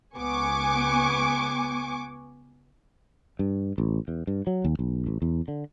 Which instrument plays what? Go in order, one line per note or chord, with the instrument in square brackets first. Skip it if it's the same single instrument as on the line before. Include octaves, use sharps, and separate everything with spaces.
[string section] C#2 B3 G#5 C#6 D6
[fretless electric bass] G2
A1
E2
G2
F#3
D#2
B1
A1
E2
D3